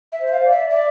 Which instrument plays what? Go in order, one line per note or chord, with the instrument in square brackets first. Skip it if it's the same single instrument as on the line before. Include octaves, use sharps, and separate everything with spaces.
[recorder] E5
[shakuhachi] C5
[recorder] E5
F5
[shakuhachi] D5
[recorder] E5
[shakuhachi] D5 [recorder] E5